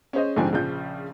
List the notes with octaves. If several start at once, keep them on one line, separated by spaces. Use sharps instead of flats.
C#4 G#4 C5 D#5
A#1 G#2 D3 F3 C4 G#5
A#1 C#3 F3 G6